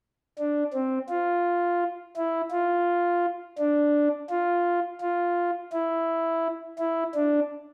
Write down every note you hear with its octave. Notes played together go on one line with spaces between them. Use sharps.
D4
C4
F4
E4
F4
D4
F4
F4
E4
E4
D4